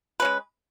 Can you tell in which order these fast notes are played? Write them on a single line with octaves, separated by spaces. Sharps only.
B4 C#4 G#3